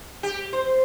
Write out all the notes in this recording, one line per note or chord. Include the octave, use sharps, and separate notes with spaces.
G4
C5